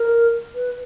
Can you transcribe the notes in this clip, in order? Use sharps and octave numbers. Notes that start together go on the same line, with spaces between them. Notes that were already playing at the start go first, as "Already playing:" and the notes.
Already playing: A#4
B4